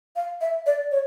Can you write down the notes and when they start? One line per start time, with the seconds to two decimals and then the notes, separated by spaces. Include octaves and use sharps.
0.16 F5
0.41 E5
0.66 D5
0.91 C#5